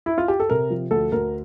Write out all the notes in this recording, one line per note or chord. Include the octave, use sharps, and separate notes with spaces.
E4
F4
G4
A4
C3 A#4
F3
D2 A4
D2 A#4